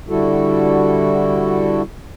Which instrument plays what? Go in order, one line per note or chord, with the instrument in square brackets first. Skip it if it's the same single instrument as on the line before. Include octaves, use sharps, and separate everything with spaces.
[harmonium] D3 G3 E4 F#4 A4